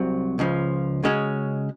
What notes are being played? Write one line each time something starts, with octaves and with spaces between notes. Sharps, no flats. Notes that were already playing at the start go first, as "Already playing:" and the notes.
Already playing: C2 C3 F#3
C#2 C#3 F3
C#3 G#3 C#4 F#4